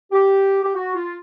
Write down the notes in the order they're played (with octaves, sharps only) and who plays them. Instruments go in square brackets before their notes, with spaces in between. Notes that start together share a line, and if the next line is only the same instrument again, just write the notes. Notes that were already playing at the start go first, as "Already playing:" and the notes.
[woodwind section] G4
G4
F#4
F4